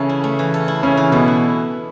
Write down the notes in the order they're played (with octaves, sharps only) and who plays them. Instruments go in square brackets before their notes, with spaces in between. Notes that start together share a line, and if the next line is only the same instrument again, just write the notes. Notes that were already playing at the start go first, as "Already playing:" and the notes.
Already playing: [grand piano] C#3 C#4 [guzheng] E3 A4
[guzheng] E4
A3
E3
A4
E4
[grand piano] C#3 C#4 [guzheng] A3
[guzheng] E3
[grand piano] B2 B3 [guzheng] A4
[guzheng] E4